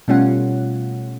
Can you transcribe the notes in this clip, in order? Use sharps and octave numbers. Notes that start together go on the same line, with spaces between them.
B2 G3 A3 C#4 F4 F#5